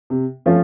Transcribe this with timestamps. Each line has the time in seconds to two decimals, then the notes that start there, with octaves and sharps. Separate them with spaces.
0.10 C3
0.46 F3 A3 C#4 F4